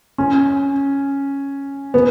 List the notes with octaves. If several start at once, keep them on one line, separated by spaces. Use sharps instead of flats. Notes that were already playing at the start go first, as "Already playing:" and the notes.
C#4
B3